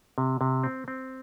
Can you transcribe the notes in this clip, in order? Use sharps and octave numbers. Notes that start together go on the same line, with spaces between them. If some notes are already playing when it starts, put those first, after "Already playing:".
C3
C3
C4
C4